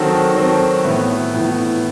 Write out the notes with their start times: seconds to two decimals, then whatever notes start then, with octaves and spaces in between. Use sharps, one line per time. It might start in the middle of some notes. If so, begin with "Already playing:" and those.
Already playing: D#3 F#3 C4 F#4 A4
0.34 D#3 F#3 C4 F#4 A4
0.84 A2 E3 B3
1.34 A2 E3 B3